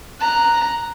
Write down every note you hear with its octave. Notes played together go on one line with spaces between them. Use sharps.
A#5 F#6